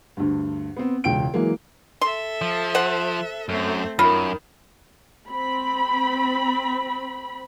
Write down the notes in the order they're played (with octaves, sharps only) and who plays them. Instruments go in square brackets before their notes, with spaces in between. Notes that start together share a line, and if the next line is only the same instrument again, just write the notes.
[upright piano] D2 G2
B3 C4
E1 C#2 G5 D7
E3 F#3 G#3 A#3
[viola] A4 E5 [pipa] C6
[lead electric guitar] F3
[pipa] C5 F#5
[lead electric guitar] F#2 [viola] A3 C4
[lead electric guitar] F#2 [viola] D#3 [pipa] F4 [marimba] B5
[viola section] C4 B5